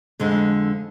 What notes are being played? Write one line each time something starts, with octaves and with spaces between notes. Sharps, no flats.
F2 D3 G#3